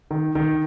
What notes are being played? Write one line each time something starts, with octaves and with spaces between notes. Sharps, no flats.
D#3
D#3